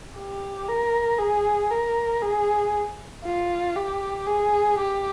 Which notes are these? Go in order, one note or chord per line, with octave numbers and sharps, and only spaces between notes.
G4
A#4
G#4
A#4
G#4
F4
G4
G#4
G4